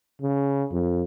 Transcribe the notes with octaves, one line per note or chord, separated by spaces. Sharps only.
C#3
F2